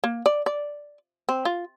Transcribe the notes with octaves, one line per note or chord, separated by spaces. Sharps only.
A#3
D5
D5
C4
F4